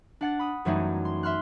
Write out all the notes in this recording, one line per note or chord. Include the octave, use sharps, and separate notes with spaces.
D4 F#5 A6
B5 D#6
F#2 E3 F#3 G3 A3 D#4
C6
E5 C6 F6 F#6